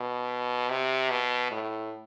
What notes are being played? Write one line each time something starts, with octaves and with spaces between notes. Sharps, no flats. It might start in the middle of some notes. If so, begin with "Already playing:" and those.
Already playing: B2
C3
B2
A2